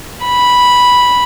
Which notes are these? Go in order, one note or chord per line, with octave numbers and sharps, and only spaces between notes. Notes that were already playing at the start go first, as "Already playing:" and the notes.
B5